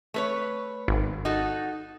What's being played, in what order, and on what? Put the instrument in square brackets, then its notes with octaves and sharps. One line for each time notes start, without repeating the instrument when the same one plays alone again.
[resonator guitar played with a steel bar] A3 B4 C#5
[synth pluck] G#1
[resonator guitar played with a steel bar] D#4 F#4 A4